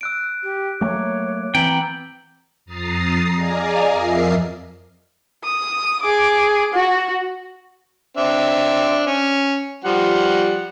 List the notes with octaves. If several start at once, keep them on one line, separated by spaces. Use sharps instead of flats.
E6 F#6 D7
G4
F#3 A3 A#3 C#5 D6
E3 B3 C4 G5 A#5 G6 F#7
F2 A#5 D#6 A6 C7
G#4 D5 D#5 F5 G#5 A#5
F2 F3 A#4 D#5 E5 C7
D#6
G#4 D6
F#4
C4 D4 E5
C#4
F3 G3 F#5